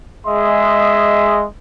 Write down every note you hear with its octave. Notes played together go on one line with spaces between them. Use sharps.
G#3 G#4 D#5 E5 C6